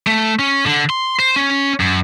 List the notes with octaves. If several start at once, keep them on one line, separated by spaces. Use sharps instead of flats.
A3
C#4
D3
C6
C5
C#4
F#2